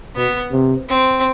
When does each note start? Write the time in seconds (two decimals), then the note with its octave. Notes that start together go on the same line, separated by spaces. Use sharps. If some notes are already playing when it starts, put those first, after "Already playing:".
0.16 B2 B3
0.51 C3
0.89 C4